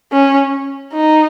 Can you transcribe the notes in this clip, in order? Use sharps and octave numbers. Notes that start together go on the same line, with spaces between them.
C#4
D#4